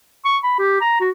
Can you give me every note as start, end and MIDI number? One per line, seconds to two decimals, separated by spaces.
0.25 0.38 85
0.44 0.57 83
0.59 0.81 67
0.81 0.99 82
1.00 1.10 66